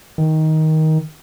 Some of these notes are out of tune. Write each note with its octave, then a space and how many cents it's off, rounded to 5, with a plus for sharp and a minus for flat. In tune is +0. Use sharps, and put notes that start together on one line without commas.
D#3 +15